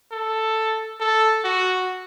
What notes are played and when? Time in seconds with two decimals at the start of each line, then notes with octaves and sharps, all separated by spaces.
0.12 A4
1.01 A4
1.44 F#4